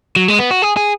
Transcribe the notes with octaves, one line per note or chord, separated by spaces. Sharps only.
F#3
G#3
B3
F#4
G#4
G#4